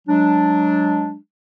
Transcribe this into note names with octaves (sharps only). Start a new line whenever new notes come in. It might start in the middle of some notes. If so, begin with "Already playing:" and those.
F#3 G#3 D4